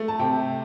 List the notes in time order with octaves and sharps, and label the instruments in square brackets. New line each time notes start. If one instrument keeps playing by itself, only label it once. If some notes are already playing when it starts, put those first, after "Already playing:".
Already playing: [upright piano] A3
A5
C3 G5